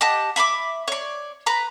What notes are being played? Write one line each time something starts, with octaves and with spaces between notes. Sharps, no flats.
G4 D#5 F#5 A5
E5 B5 C6 D6
C#5 D5
B4 A#5 B5